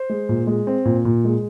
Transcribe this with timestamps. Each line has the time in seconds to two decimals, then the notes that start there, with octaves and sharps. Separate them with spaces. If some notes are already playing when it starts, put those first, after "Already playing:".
Already playing: C5
0.09 G#3
0.29 A#2
0.47 G#3
0.67 C4
0.85 A#2
1.05 A#2
1.25 G#3